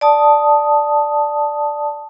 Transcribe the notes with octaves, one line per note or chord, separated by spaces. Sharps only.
D5 A5 D#6